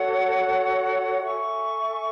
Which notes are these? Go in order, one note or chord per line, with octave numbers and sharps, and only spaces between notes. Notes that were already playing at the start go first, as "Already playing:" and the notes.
Already playing: F#4 A4 C#5 F#5
A4 E5 G#5 C#6